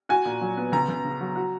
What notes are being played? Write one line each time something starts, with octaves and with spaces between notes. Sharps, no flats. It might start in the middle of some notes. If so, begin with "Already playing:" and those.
F#4 G#5
A#2
F#3
B3
C#2 A#5
C#2
C#3
F#3
F#4